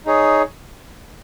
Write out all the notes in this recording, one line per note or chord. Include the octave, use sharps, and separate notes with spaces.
D#4 G#4 C#5